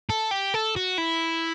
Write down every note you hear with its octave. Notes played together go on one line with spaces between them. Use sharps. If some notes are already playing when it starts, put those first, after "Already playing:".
A4
G4
A4
F#4
E4